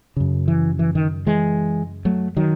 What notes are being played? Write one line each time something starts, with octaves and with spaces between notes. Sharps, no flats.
F#2 C#3
E3
E3
D#3
E3 G#3
F#3 A3
D#3 F#3